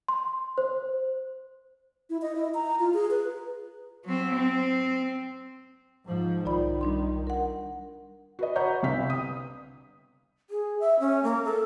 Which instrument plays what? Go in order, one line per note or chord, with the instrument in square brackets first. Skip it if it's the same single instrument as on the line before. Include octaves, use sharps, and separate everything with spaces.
[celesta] C6
C5
[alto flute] E4
D#5
E4
A#5
F4
G#4
B4
[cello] F#3 C4
C4
[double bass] G#2 F3
[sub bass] B1 [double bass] D#3 [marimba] F4 D5 B5
[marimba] G3 D4 C6
A#4 F#5
[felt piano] F#4 B4 D#5
B4 C#5 F#5 A#5 C#6 G6
G1 C2 C3 C4 F5 B6
D#6
[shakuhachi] G#4
E5
C#4
A#3
A4